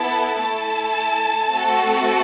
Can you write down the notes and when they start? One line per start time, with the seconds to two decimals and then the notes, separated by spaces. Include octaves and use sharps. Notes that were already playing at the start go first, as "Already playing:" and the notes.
Already playing: B3 E4 A4 A5
0.38 A3 E4 A4 A5
1.50 A3 C4 F#4 A4